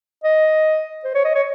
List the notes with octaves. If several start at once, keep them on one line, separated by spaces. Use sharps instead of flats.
D#5
C5
C#5
D#5
C#5